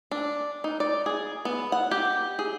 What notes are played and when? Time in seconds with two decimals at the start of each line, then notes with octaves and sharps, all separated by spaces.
0.11 D4
0.64 D#4
0.80 D5
1.06 G#4
1.45 B3
1.72 F#5
1.91 G4
2.39 G#4